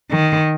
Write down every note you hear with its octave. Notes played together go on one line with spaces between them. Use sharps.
D#3